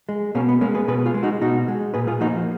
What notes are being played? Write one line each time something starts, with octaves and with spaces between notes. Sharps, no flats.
G#3
B2 A#3 C#4
B3
G#3 A#3 C#4
G#4 B4
B2 G#4 B4
F4 G#4
G#3
D#4 F#4
B2 D#4 F#4
G#3
A#2 G#4 B4
F4 G#4
F3 A#3 D#4 F#4